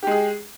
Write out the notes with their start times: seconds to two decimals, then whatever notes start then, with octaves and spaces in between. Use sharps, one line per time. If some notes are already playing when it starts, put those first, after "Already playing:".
0.03 G4
0.07 G#3
0.11 G#4